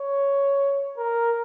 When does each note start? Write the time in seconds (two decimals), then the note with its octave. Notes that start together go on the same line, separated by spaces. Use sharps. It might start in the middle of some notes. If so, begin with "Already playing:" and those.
Already playing: C#5
0.97 A#4